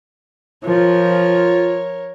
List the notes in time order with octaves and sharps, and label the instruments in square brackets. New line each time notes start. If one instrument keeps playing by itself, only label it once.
[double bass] F3 [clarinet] F4 [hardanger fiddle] A#4 C#5